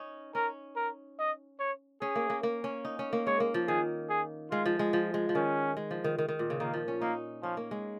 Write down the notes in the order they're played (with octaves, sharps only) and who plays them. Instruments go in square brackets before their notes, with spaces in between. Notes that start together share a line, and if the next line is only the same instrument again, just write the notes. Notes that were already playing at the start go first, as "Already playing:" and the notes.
Already playing: [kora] C#4 D#4
[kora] C#4 [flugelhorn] A#4
[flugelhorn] A#4
D#5
C#5
[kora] C#4 [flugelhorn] G#4
[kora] A#3
A#3
A#3
C#4
D#4
C#4
A#3
[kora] G#3 [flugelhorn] C#5
[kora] A#3
F3
[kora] D#3 [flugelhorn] G#4
[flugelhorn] G#4
[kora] G#3 [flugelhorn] F4
[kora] F3
G#3
F3
G#3
F3
[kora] D#3 [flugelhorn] C#4
[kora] G#3
F3
D#3
D#3
D#3
A#2
C#3
[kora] D#3 [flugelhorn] A#3
[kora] F3
C#4
[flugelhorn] A#3 [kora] D#4
[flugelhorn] F3 [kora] C#4
[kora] A#3
G#3